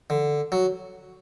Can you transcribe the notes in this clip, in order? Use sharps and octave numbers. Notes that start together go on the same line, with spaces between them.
D3
F#3